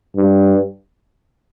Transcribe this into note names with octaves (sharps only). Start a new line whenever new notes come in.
G2